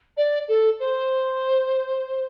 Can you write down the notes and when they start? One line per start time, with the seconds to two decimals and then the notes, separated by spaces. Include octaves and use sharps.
0.17 D5
0.48 A4
0.80 C5